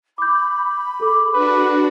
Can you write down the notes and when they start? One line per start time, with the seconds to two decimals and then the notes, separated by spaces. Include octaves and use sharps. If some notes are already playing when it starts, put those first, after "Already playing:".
0.18 B5 D6 G6
1.00 G#4 A4 D6
1.34 D4 F#4 B4